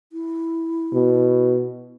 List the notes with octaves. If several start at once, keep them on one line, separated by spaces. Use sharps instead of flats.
E4
B2